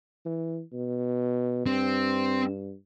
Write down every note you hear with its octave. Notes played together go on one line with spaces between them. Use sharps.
E3
B2
G2 C4